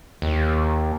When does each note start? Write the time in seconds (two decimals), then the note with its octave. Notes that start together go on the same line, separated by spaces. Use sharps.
0.22 D#2